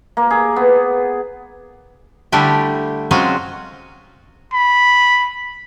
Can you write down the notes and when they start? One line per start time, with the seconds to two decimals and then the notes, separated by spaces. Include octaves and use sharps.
0.17 A#3
0.31 G#4
0.56 B3
2.32 D3 G3 A3 D4 E4 G4
3.11 F#3 G#3 C4 C#4 F4 F#4
4.53 B5